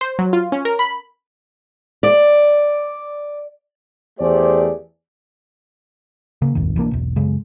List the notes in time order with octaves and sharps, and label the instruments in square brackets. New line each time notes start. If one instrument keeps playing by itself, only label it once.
[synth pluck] C5
F#3
F4
C#4
A#4
B5
[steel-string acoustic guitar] D5
[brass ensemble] E2 A3 G4 G#4 C5 D5
[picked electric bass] C#3 A#3
D#1 G#1 F2 D#3
B1 E3 A#3 D4
E1 B1
F#2 C#3 G#3